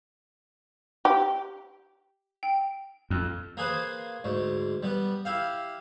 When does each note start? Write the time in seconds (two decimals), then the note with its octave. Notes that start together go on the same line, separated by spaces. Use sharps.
1.05 G4
2.43 G5
3.10 F2
3.57 A#3 G#4 B4 C5
4.24 D2 G#2
4.83 G3 B3
5.25 E4 G4 F5